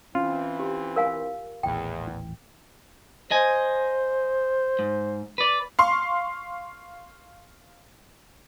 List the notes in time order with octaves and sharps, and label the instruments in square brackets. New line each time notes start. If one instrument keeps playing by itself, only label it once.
[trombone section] E3 C4 [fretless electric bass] C#4 [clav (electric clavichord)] F4
[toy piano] G4
A#4 F5 G#5
[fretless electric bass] D#1 A1 E3 [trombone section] E2 [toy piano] G5
[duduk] C5 [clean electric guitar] D#5 G#5
[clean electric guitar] G#2
B4 D5
[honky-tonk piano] F5 C6 C#6